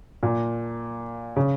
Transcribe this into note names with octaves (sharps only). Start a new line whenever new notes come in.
A#2
C#3